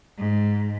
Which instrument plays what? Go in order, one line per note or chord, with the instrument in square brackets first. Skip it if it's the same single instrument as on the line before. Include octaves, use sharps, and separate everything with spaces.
[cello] G#2